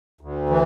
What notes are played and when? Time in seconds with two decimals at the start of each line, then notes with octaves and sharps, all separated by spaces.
0.21 D2
0.50 E3